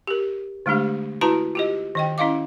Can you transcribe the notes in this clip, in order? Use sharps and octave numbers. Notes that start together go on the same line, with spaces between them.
G4 A#4
D3 G#3 A3 D4 G4
E4 F#4 B4 A5 A#5
F4 G4 D#5
D#3 D#5 G5
C#4 E4 D#5 F5 D6